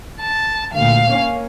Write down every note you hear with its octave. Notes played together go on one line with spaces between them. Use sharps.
A5
D2 A#2 F5
A#3 C#4